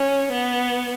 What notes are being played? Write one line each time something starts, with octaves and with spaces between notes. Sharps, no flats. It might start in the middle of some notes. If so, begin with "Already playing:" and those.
Already playing: C#4
B3